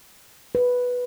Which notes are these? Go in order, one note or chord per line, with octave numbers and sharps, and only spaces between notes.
B4